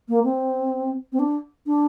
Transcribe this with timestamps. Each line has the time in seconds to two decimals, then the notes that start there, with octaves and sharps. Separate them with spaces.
0.09 A#3
0.24 C4
1.12 C4
1.19 D4
1.66 D4